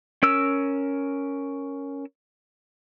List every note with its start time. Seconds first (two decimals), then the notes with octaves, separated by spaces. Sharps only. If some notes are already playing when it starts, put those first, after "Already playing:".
0.23 C#4 A#4 E6